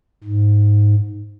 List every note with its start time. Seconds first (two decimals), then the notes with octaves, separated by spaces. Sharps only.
0.23 G#2